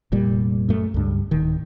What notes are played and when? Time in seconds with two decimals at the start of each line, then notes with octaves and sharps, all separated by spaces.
0.12 F1 A#2 G3
0.69 F#2 A3
0.94 C#2 G2
1.31 D1 D#3